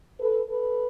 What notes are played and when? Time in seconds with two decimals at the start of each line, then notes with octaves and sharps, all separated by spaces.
0.20 A4 B4
0.48 A4 B4